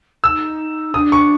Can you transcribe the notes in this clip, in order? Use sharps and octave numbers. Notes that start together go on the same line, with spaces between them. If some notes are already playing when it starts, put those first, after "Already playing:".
D#4 E6
D4 D#6
C#6